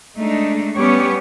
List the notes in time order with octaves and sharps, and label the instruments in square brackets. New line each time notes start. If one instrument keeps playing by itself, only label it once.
[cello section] G#3 A3 D4 D#4
G3 B3 C#4 G4 C#5